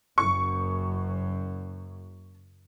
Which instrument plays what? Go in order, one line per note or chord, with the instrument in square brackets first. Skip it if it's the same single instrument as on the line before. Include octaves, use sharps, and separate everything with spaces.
[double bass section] F#1 F#2 [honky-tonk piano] C#6